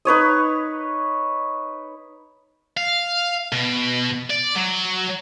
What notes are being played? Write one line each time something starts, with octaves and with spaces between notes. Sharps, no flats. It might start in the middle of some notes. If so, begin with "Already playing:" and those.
D#4 B4 C#5 D#5
F5
B2
D5
F#3